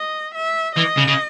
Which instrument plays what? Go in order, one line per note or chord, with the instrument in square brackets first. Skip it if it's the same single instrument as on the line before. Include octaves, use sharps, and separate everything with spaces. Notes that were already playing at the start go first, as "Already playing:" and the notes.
Already playing: [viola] D#5
E5
[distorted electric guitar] E3 [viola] D#5
[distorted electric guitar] C#3
C#3